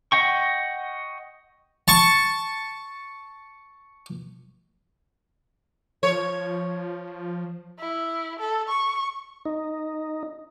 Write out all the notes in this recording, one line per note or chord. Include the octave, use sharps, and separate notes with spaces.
D#5 F#5 G5 C#6
A5 C#6
F3 C#5
E4
A4
C#6
D#4